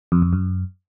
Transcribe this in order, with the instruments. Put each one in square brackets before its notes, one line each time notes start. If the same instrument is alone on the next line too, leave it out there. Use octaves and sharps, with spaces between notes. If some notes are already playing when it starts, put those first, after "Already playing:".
[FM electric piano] F2
F2
F#2